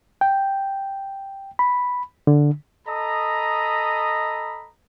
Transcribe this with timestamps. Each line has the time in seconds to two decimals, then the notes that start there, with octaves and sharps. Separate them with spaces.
0.21 G5
1.59 B5
2.27 D3
2.87 A4 D#5 A#5 B5 D#6